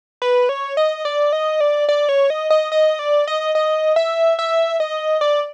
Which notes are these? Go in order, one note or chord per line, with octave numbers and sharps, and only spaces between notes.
B4
C#5
D#5
D5
D#5
D5
D5
C#5
D#5
D#5
D#5
D5
D#5
D#5
E5
E5
D#5
D5